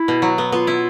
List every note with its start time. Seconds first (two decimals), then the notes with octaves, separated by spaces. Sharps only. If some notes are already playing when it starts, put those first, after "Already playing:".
Already playing: E4
0.08 B2
0.22 F#3
0.38 B3
0.52 B3 F4
0.67 E4